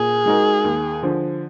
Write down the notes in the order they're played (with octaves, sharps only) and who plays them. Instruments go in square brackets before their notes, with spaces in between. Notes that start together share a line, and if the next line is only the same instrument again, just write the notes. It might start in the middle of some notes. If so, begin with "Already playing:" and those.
Already playing: [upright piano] A#2 [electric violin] G#4
[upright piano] G#3 D#4 F#4 A#4
D#2
D3 F3